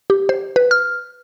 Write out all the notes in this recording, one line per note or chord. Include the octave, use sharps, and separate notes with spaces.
G4
C5
B4
F6